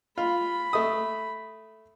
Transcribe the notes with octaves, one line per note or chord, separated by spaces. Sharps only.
F4 B5
A3 D#6